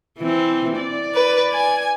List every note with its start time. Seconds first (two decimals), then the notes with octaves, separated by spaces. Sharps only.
0.19 E3 C4
0.79 D5
1.14 B4
1.54 G#5